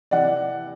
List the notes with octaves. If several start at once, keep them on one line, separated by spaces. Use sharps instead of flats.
C3 E3 D5 F#5